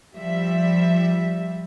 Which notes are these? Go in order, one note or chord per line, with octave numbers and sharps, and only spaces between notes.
F3 G3 E5